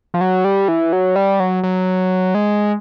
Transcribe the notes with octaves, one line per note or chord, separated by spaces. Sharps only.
F3
F#3
G3
E3
F#3
G3
F#3
F#3
G#3